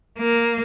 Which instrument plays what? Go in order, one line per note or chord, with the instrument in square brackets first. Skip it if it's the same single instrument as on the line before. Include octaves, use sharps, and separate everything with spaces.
[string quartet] A#3